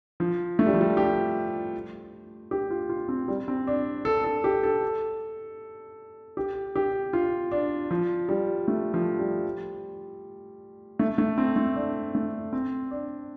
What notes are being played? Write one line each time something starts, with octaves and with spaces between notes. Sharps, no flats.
F3
A3
G3
F3
G3
G4
G4
F4
F4
C4
G3
C4
D4
A4
A4
G4
A4
G4
G4
F4
D4
F3
G3
A3
F3
G3
A3
A3
C4
A3
D4
A3
C4
D4